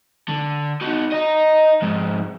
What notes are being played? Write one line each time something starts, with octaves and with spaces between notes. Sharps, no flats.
D3
D#4 F#4
D#5 A#5
F2 G#2